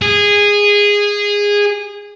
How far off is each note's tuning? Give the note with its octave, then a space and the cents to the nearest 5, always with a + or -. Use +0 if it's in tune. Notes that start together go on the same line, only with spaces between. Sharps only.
G#4 -15